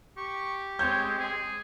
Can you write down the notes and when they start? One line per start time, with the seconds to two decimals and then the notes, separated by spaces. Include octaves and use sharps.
0.17 G4 C#6
0.79 G#3 C4 C#5 G6
1.19 G#4